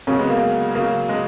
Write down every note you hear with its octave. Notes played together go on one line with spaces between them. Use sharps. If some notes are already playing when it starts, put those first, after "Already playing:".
C#3 F#3 A#3 C#4
G#3 B3
A#3
C#3 F#3 A#3
G#3